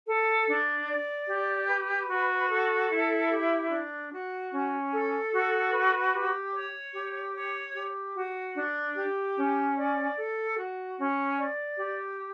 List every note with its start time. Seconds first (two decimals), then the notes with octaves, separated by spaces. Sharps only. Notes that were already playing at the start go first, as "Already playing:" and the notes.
0.06 A4
0.47 D4
0.87 D5
1.27 G4
1.68 B4
2.08 F#4
2.50 A4
2.90 E4
3.30 G4
3.70 D4
4.11 F#4
4.51 C#4
4.91 A4
5.31 F#4
5.72 B4
6.13 G4
6.53 C#5
6.93 G4
7.34 C#5
7.74 G4
8.14 F#4
8.56 D4
8.95 G4
9.37 C#4
9.77 D5
10.17 A4
10.58 F#4
10.98 C#4
11.38 D5
11.78 G4